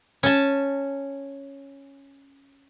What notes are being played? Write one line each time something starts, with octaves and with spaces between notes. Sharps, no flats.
C#4 A5